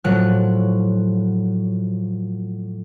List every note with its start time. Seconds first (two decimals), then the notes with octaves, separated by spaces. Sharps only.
0.04 A2 F3 F#3 F#6